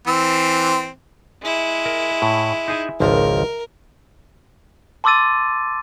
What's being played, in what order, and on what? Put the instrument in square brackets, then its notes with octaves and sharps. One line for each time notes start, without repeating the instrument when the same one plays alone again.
[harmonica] E3 C4
[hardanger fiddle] G#3 E4
[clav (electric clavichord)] A#4
A2
D#4 G#4 G#5
[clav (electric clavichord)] G#1 C#2 F3 [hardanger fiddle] A#4
[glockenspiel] A5 C6 D6 E6 A6 D#7